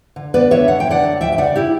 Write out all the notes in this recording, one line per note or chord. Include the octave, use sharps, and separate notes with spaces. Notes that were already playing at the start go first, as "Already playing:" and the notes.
D3
B3 B4 D5
D3 C#5 E5
B3 F#5
G5
D3 D5 F#5
F#3
D2 E5 G5
E5
C#3 D5 F#5
E4 G4